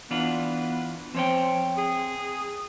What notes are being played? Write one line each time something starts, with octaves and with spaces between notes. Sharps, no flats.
E3 B3 D4 F4
F3 C4 C#5 G5
G#4